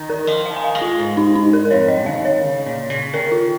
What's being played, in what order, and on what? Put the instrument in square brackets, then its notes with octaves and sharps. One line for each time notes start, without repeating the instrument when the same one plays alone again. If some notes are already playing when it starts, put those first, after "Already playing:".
Already playing: [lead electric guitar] D#3
[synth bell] A#4
[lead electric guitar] F3 [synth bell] D#5
[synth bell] F5
[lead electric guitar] D#3
[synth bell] G#5
F5
[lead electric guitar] G#3
[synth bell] F4
[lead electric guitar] G#2
[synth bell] D#4
D#4
A#4
A#4
[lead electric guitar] F2 [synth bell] C#5
[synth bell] D#5
[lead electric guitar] D#3 [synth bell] F5
[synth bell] C#5
[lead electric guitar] C#3
A#2
C#3
[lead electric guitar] D#3 [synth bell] A#4
[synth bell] F4